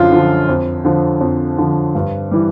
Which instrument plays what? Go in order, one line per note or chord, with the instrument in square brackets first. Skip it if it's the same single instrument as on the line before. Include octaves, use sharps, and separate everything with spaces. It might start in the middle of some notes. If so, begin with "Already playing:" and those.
Already playing: [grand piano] F#2 D3 F3 F4
D3 F3
F2
D3 F3
F2
D3 F3
G2
E3 G3